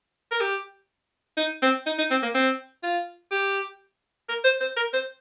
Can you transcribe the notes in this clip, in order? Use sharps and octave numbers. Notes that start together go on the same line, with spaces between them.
A#4
G4
D#4
C4
D#4
D#4
C4
A#3
C4
F4
G4
A#4
C5
C5
A#4
C5